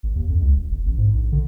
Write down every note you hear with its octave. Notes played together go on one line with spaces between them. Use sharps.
G#1
D#2
F2
C#2
D#1
G1
A1
G#2
A#1
D3